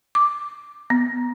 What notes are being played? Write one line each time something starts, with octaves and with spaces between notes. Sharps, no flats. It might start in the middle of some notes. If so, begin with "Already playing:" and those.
D6
B3